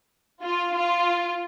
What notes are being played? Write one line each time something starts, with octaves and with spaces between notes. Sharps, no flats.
F4
F4